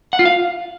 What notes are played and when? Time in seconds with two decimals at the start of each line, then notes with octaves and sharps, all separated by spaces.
0.13 F#5
0.19 F4
0.26 F5